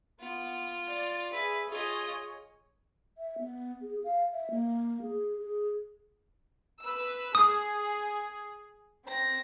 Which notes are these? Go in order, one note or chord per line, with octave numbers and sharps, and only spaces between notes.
B3 F4 F#5
D5
G#4 B4 E5
F4 G#4 C#5 D#5
E5
B3
G#4
F5
E5
A#3
G#4
G#4
B4 E6
G#4 D#6
C4 A#6